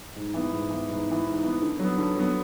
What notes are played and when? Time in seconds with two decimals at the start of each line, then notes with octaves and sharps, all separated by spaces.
0.16 G#2
0.34 E3 B3
0.53 G#2
0.70 E3 B3
0.89 G#2
1.07 E3 B3
1.25 G#2
1.43 E3 B3
1.62 D3
1.79 F#3 B3
1.98 D3
2.16 F#3 B3